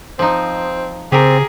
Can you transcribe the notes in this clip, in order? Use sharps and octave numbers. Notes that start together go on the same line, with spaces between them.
F3 C4 D#4
C#3 C4 G4 G#4 A#4